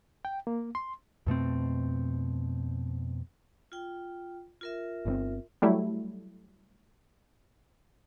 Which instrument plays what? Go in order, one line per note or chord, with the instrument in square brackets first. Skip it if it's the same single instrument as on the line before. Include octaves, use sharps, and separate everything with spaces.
[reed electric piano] G5
A#3
C6
[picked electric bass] F2 B2 A3 C4
[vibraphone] F4 G5
F4 A#4 E5
[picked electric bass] G1 D3 C4
[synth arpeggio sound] F#3 G3 A3 E4